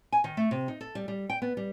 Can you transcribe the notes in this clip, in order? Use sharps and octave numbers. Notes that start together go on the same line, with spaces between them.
G#5
D#3
A3
C3
D#4
A4
G3
G3
G5
B3
G3